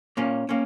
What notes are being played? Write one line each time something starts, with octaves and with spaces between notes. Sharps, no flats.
A#2 A#3 C#4
A#3 C#4